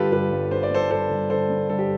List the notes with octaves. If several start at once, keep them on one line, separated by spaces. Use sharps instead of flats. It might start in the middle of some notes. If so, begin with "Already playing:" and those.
Already playing: G2 D3 F4 G4 A4 B4
G1 G4 B4
G1
D3 C5
D5
G2 A4 C5
G1 A4 C5
G1
D3 A4 C5
G2
G1 A4
G4